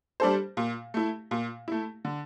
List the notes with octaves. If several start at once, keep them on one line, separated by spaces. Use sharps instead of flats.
G3 D4 A4 C5
A#2
A3 E4
A#2
A3 E4
D3